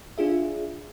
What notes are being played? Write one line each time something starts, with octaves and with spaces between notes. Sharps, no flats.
D4 F4 G#4 E5